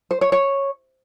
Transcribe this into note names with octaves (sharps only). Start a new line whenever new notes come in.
C5
C#5
C#5